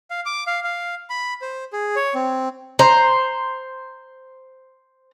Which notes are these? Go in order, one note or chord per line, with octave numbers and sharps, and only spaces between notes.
F5
D6
F5
F5
B5
C5
G#4
C#5
C4
C5 A#5